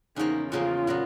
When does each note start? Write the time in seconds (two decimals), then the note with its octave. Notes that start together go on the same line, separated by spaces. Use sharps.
0.16 E2 C#3 F3 A#3 D#4
0.52 E2 C#3 F3 A#3 F4
0.87 A#2 F#3 B3